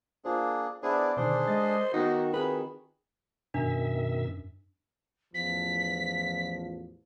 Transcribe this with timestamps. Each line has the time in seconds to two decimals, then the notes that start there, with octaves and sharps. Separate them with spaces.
0.25 A#3 D4 F4 G#4 C5
0.83 B3 D4 E4 G#4 C5 D5
1.17 B2 D3 D#3 D4 G#4 C5
1.48 G#3 D#5 A6
1.93 D#3 B3 D#4 F#4 D#5
2.33 C4 F4 F#4 G#4 B4
3.54 F#2 B2 D#3 D4 E5
5.34 A1 E2 F3 B6